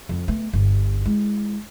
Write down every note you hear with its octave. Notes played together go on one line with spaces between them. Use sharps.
F2
A3 B3
G1
G#3 E4